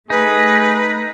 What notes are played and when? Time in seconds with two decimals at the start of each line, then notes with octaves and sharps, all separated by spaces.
0.10 A3 D#4 G#4 B4